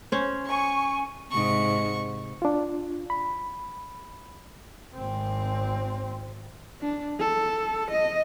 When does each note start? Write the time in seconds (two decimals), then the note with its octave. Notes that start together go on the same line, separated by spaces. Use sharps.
0.12 C#4 C5
0.48 G#5 C#6
1.31 G#2 C3 C#6
2.42 D4 F4
3.10 B5
4.96 G#1 C4
6.82 D4
7.19 A4
7.91 D#5